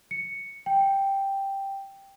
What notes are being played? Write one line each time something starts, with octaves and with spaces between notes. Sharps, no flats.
C#7
G5